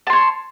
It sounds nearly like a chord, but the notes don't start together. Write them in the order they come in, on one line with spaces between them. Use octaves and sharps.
A5 C6 C#5